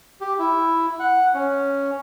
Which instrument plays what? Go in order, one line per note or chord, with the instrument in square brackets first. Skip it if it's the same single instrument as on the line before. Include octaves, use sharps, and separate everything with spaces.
[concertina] G4
E4
F#5
C#4